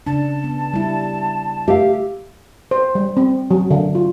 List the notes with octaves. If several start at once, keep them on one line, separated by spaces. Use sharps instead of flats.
C#3 D4 A5
B3
G3 E4
A3 G4 E5 F5
C5
G3
C4
F#3
D3
F4